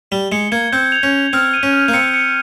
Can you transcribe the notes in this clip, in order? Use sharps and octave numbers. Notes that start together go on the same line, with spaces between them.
G3 G7
G#3 C#7
A#3 G#6
C4 G6
F7
C#4
F7
C4 F6
D#7
C#4
F6
A#3
C4 C#7
C#7